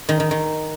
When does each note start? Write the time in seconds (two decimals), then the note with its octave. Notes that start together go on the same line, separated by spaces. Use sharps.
0.09 D#3
0.20 D#3
0.31 D#3